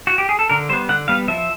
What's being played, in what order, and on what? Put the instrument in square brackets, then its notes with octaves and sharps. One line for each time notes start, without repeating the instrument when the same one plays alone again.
[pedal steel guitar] F#4
G4
G#4
A4
D3 A#4
G3 C5
B3
D3 F#5
G3 B3 F5
F3 E5